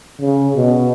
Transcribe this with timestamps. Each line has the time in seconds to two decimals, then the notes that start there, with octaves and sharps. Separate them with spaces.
0.21 C#3
0.56 B2